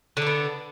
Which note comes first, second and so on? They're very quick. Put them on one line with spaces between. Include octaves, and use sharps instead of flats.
D3 D4 B3